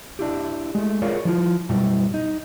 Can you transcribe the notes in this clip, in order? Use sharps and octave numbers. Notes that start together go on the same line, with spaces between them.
D4 E4 G4
G#3 A3
F4 G#4 A#4 C#5 D5 F5
F3 E4 F4
F#2 B2 G3 E4
D#4